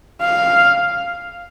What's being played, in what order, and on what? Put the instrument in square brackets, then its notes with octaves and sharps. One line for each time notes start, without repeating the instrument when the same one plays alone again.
[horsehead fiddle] F5